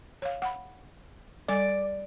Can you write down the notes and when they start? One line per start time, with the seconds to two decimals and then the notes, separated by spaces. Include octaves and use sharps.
0.22 C#5 F5
0.42 F#5 B5
1.48 G3 A4 D5 G#5